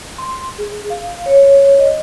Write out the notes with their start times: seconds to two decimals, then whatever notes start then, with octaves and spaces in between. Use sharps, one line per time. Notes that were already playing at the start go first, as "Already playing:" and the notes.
0.18 C6
0.58 G#4
0.90 F5
1.26 C#5
1.79 D#5